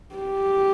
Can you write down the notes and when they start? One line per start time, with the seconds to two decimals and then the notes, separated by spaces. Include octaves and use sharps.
0.15 G4